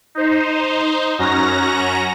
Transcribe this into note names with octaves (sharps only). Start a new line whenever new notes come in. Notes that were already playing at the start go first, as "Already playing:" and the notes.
D#4 C5
F#2 C#4 F#4 A#5 A#6